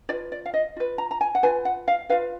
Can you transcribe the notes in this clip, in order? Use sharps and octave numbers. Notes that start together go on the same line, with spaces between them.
F4 B4 D5
D5
F5
D#5
F4 B4
A#5
A#5
G#5
F#5
F4 B4 G#5
F#5
F5
F4 B4 F5